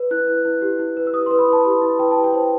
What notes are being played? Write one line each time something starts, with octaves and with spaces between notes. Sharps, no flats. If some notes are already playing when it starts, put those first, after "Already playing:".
Already playing: B4
E4 F#6
B4
E4
G4
E4
B4
E6
E4 D#6
C6
B4
B5
E4
A5
G4 B5
E4
B4 G5
A5
E4
G5
C5